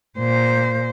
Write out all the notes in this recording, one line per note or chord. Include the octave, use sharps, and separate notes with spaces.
A#2 C5